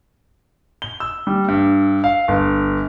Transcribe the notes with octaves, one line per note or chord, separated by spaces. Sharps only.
G7
E6
G3
G2
F5
G1